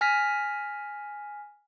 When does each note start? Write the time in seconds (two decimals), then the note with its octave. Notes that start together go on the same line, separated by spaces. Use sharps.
0.01 G#5 F6 A#6 B6